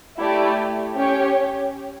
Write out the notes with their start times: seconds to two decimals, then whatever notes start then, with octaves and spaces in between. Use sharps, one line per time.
0.18 A3 E4 G4 D5
0.96 C#4 G4 C#5